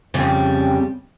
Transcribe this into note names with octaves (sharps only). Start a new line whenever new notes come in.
F2 C#3 G3